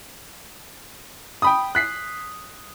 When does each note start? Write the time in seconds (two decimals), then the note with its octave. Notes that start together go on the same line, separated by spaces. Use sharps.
1.42 G5 B5 D#6
1.75 F#6 B6 C7